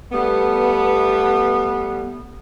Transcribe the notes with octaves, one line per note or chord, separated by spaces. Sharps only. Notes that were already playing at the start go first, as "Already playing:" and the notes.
G3 A3 B3